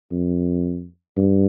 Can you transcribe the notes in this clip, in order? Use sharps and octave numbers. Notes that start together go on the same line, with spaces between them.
F2
G2